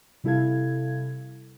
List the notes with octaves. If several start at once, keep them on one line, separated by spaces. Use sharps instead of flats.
C3 G3 E4 A4 F5 G#6